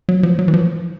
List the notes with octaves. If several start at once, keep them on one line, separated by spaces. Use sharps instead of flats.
F#3
F3
F#3
E3
F3